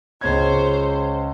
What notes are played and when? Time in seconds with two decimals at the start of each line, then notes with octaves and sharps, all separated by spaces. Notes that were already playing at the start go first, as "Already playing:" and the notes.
0.21 C#2 C5 C#5 G#6